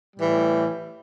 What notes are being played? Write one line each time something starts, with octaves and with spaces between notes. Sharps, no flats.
A2 E3 G3